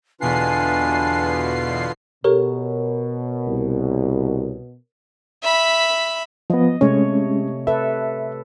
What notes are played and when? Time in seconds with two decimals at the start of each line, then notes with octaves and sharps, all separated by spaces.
0.21 E2 B2 D3 D4 F4 B4 G#5 C7
2.24 B2 G4 A4 A#4 C#5
3.47 C2
5.42 E5 B5
6.50 F3 B3 D#5
6.81 C3 G#3 A3 C#4 C#5
7.67 A4 B4 E5